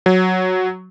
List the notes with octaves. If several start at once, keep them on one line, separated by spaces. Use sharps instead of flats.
F#3